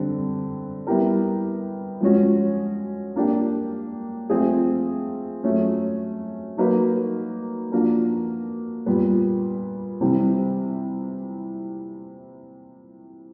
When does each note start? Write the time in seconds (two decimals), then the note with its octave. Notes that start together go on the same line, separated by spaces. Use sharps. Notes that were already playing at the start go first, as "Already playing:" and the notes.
Already playing: D3 G3 C4
0.87 G3 B3 E4 G4 A#4
2.01 F3 G#3 C#4 F#4
3.16 A#3 D4 G4
4.30 F3 A3 C4 F4 G#4
5.44 F#3 A3 C#4
6.57 F#3 A#3 D#4 F#4 B4
7.72 F3 A#3 D4 F#4 A#4
8.86 A#2 G3 B3
10.01 C3 E3 G3 C4